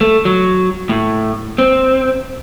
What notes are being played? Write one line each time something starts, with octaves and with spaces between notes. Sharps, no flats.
A3
F#3
A2
C4